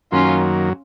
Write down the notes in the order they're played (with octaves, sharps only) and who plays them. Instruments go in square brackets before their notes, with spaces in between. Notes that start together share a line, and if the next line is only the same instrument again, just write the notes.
[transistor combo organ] F#2 D#3 F#3 A#3 [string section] C#4 F4